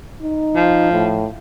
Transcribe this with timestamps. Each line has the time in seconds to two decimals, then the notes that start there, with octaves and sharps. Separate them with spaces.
0.22 D#4
0.56 F3
0.93 A2